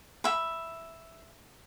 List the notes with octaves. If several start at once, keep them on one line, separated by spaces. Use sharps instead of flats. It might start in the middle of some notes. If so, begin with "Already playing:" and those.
E5 B5